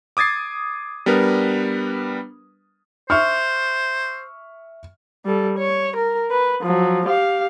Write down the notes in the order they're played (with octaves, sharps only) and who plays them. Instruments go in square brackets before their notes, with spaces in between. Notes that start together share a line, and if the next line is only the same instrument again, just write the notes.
[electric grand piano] D6 D#6 G#6 A6 C7
G3 B3 D4 A#4 B4
[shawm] C5 [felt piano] E5 C#6 F6
[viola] G3 A4
C#5
A#4
B4
F3 F#3
G4 F5